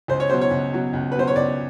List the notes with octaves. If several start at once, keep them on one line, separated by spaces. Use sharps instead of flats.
C#2 C5
C#5
B2 F#3 C5
C#5
C#2
B2 F#3
C#2
B4
B2 F#3 C5
C#5
C#2 D5